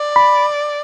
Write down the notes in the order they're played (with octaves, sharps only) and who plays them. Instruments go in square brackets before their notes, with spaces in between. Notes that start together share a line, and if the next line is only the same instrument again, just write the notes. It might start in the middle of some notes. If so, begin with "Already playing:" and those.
Already playing: [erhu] D5
[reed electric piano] B5